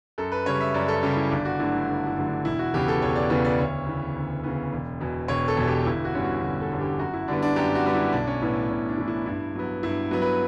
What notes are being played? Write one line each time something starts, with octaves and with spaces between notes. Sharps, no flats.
F#2 A4
B4
C#3 G3 C#5
E5
F#2 D5
A4
C#3 G3 G4
E4
G1 D4
F#4
G2 D3 F#3 A3 E4
D4
G1 D4
E4
G2 D3 F#3 A3
D4
E1 E4
F#4
E2 C#3 E3 B3 G4
A4
E1 C#5
D5
E2 C#3 E3 B3 D5
D5
D2 C#5
C#3 E3 B3
D2
C#3 E3 B3
E1
E2 B2
E1 C#5
A4
E2 B2
G4
G1 E4
F#4
G2 D3 G3 C#4
F#4
G1 F#4
A4
G2 D3 G3 C#4
G4
F#2 F#4
E4
D3 G3 B3 D4
D4
F#2 G4
F#4
D3 G3 B3
E4
B1 D4
C#4
A2 E3 B3 E4
B1 C#4
D4
A2 E3 B3
E4
G2 E4
F#3 B3
G2 E4
F#3 B3
B4